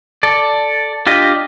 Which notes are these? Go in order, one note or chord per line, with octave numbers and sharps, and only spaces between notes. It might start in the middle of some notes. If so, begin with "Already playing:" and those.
A4 D5
D4 F4 G4 D#5